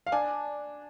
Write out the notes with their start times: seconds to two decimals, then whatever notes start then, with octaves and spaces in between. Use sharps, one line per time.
0.07 F5
0.12 D4 G#5